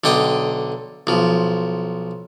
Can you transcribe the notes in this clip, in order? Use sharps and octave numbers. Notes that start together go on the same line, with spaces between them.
B1 D3 D#5 G5 D#6
B1 F3